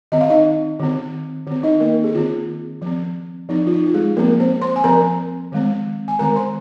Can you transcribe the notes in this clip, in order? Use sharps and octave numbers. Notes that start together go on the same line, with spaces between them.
D#3 C4 D#5
F5
D#4 D#5
D#3 C4
D#3 C4
D#4 D#5
A#3 A#4
G#4
D#3 C4 F4
F3 C4
F3 C4 D#4
F4
D#4
F4
G#3 G#4
F3 A#3 C4 A#4
C4 C5
C5 C6
G#5
F3 C4 A#4 A#5
D#3 G#3 C4
G#5
D#3 G#3 C4 A#4 A#5
C5 C6